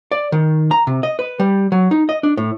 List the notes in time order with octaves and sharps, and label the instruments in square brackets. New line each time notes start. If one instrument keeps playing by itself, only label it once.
[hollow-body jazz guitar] D5
D#3
A#5
C3
D#5
B4
G3
F#3
D#4
D#5
D4
A2